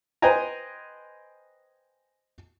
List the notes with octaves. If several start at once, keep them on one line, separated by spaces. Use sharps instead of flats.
B4 C5 D#5 G5 G#5 A#5